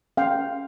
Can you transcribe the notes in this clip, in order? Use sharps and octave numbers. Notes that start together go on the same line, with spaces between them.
C#4 F5 G5